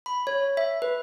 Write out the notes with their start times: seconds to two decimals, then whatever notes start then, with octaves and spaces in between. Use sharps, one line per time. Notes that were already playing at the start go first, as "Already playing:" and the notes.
0.06 B5
0.27 C#5
0.57 E5
0.82 B4